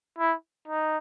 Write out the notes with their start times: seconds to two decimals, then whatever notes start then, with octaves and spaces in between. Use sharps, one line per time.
0.19 E4
0.68 D#4